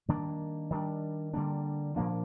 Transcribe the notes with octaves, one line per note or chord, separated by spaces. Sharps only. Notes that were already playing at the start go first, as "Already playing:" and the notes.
D#3 G3 A#3 D4
D#3 G3 D4
D3 G3 A#3 D4
A#2 F3 A#3 D4